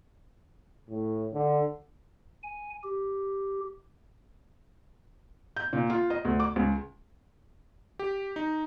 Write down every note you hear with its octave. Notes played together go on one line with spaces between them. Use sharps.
A2
D3
G#5
G4
G6
A#2
F4
D#5
D2
D6
C#2
G4
D#4